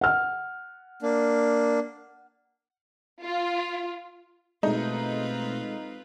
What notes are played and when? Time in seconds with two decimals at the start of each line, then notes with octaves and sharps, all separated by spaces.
0.01 F#5 F6
1.02 A#3 D4
3.22 F4
4.63 B2 G#3 A3 C4 D#4 F4 A4 B4